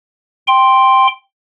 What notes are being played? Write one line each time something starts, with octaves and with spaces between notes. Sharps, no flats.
G5 C6